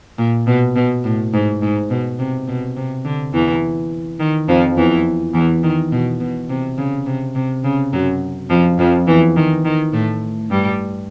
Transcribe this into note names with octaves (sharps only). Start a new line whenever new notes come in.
A#2
B2
B2
A2
G#2
G#2
B2
C3
B2
C3
D3
E2 E3
D#3
F2 F3
E2 E3
E2 E3
D#3
B2
B2
C3
C#3
C3
C3
C#3
F#2 F#3
F2 F3
F2 F3
E2 E3
D#3
D#3
A2 A3
G2 G3